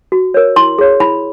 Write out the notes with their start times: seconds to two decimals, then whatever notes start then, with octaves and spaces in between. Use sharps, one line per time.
0.12 F#4
0.34 A#4 C#5
0.56 E4 C6
0.79 G#4 C#5
1.00 E4 B5